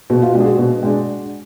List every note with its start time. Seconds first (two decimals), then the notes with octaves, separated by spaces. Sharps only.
0.10 B2 F#4
0.22 F4
0.33 G#3 D4 F#4
0.40 G#4
0.46 F#4
0.58 B2
0.83 G#3 D4